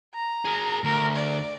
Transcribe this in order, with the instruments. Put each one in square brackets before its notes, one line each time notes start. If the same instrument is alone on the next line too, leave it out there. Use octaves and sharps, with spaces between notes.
[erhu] A#5
[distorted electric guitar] G#4 A#4
[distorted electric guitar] D2 [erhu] A#4
[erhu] D5